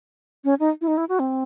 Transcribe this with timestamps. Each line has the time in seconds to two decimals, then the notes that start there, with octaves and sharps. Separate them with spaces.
0.44 C#4
0.60 D#4
0.81 E4
0.88 D#4
0.97 E4
1.09 F#4
1.19 C4